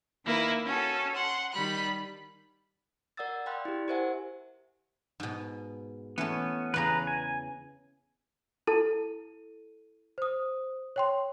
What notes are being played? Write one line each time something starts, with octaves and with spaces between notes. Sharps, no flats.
D#3 A#3 E4 B4
C#4 F#4 A4
F#5 C6
D#3 G3 B5 F#6
A#4 D5 F#5 D#6 E6 A6
D5 F5 G5 B5 C6 F#6
E4 G4
G4 A#4 C5 E5 F#5 G#5
G#2 B2
E3 A3 B3 C#4
E2 C#3 G#4 B4 A#5
G#5
E4 A4 A5 D#7
C5 D#6
C#5 G5 C6